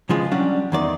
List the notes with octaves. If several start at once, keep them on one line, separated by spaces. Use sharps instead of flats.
C#3 E3 F3 G#3
F#3 G3 C#4 D4
E2 D#3 D5